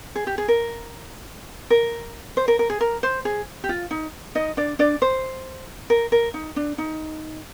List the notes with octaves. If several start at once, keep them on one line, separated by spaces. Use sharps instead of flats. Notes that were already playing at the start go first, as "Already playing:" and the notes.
G#4
G4
G#4
A#4
A#4
C5
A#4
A#4
G#4
A#4
C5
G#4
G4
F4
D#4
D#4 D#5
D4 D5
D4 D5
C5
A#4
A#4
D#4
D4
D#4